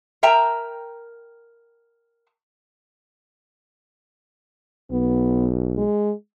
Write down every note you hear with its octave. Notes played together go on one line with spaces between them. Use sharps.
A#4 E5 G5 A#5
B1 B3
G#3